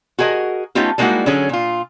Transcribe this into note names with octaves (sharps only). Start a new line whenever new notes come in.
F#4 G#4 A#4 D#5
A3 B3 C#4 D#4 F4 G4
G3 G#3 A#3 D#4 E4 F#4
D3 F#3 C#4 G#4
A#2 F4